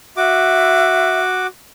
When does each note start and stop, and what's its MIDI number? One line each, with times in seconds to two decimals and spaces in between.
0.17 1.47 66
0.17 1.20 76
0.17 1.47 86